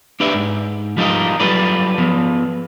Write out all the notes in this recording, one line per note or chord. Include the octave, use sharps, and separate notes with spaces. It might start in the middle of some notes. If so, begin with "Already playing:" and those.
D4 G4 B4 D5 E5
G#2
F3 G3 D#4 F4 A#4 D#5
F#3 G3 F4 A4 B4 D5
F3 B3